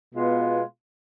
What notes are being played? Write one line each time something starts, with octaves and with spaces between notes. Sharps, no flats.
B2 G#3 B3 F4